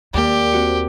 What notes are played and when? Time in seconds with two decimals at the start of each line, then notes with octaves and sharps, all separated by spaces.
0.14 D#2 A#3 G4 D5
0.52 C4 F#4 C#7